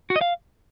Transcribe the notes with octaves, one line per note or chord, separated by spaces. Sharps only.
F#4
D#5
F5